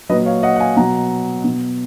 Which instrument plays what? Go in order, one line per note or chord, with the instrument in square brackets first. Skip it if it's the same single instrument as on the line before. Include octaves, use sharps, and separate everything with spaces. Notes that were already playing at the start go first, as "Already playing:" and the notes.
[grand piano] A#2 F#3 B4 D#5
C#5 F5
D#5 F#5
F#5
F5 G#5
B2 F#3 F#5 A#5
B2 F#3